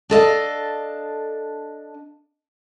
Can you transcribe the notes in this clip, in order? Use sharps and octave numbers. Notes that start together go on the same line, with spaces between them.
D4 A4 D#5 F5